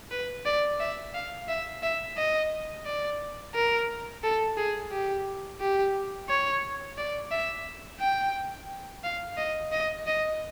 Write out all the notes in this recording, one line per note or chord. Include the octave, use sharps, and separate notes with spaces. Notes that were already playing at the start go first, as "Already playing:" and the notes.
B4
D5
E5
F5
E5
E5
D#5
D5
A#4
A4
G#4
G4
G4
C#5
D5
E5
G5
F5
D#5
D#5
D#5